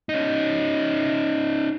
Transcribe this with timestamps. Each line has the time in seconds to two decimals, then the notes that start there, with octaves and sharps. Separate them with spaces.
0.09 C#4 D#4